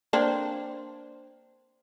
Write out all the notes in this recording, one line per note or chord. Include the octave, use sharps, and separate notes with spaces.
A#3 C4 D4